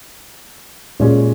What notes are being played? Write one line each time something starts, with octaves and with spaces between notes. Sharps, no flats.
A#2 G#3 C#4 G#4